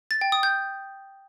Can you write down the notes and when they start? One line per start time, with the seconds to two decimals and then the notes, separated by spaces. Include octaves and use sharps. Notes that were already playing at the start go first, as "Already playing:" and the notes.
0.11 A6
0.21 G5
0.32 D#6
0.43 G6